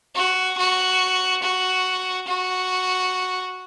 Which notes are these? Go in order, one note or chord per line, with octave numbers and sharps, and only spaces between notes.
F#4
F#4
F#4
F#4